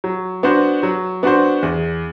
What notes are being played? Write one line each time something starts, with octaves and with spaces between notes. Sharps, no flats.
F#3
B3 D4 F#4 C5
F#3
B3 D4 F#4 C5
E2